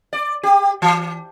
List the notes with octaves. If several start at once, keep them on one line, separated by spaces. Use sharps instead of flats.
D5
G4
E3